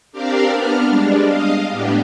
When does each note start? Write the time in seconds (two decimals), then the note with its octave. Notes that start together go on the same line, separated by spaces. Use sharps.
0.12 C4 D4 G4 A#4 D5 F5
0.51 B3 D4 F6
0.86 G3 G#3 D4
1.23 D#5 F5
1.71 A2 B3 D4 G4